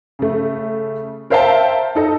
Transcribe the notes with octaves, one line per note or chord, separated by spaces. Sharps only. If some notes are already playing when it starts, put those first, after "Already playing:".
C#3 A3
A#4 C5 E5 F5 G5 A5
D#4 A4 D#5